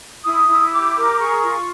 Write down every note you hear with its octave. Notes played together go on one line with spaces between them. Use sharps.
E4 D#6
E4
G4 D6
A#4
G#4 C#6
F4